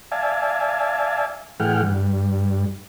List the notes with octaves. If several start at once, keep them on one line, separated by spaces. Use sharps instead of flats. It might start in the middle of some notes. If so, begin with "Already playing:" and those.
D5 E5 F5 G#5 A5
A2 E3 G#4 F#5 G5 F6
G2